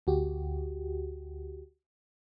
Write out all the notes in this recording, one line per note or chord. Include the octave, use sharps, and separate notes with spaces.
D2 F#4 G4